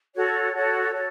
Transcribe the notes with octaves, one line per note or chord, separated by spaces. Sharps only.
F#4 A4 C#5
F#4 A4 C#5
F#4 A4 C#5